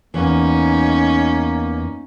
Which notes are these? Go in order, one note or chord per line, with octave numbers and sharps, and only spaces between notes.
E2 A#3 C#4 D#4